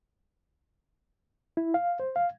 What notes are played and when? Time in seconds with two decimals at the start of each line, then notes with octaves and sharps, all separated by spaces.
1.57 E4
1.74 F5
2.00 C5
2.16 F5